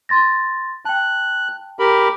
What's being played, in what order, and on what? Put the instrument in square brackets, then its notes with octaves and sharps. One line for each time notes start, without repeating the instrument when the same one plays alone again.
[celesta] C6 A6 A#6
[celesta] G5 A5 [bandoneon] F#6
[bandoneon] G4 A#4 B5